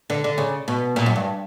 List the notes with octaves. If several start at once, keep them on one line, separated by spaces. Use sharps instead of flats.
D3
D3
C#3
B2
A#2
F#2
G2